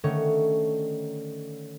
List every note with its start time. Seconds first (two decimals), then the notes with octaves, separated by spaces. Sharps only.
0.04 D3 D#3 A3 C#4 C#5